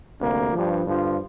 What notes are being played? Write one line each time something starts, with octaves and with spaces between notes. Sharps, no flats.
D2 C3 G3 A#3
G2 F3
G2 D3 F3